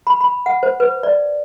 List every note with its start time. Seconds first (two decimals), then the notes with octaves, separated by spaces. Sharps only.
0.07 B5
0.21 B5
0.46 F#5
0.63 C5
0.80 B4
1.03 D5